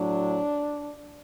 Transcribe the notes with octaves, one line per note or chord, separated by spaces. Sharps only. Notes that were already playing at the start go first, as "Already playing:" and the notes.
Already playing: A2 F#3 D4